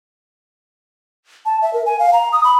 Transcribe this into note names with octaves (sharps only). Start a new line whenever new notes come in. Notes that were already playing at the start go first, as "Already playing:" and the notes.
A5
E5
A#4
G#5
F5
A#5
D#6
B5